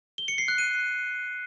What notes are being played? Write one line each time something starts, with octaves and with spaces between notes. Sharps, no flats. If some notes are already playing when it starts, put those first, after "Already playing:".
G7
C#7
C7
F#6
D#7